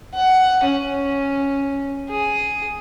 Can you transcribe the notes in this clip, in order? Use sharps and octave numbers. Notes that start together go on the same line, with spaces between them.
F#5
C#4
G#4